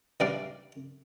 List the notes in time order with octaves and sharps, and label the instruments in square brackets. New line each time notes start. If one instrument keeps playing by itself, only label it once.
[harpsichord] E3 G3 D4 D5 F5